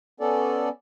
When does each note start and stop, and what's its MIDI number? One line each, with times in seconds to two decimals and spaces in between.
0.20 0.69 59
0.20 0.69 61
0.20 0.69 69
0.20 0.69 74